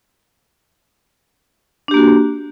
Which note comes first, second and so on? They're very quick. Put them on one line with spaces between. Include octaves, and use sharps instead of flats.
D4 G4 A#3 F#4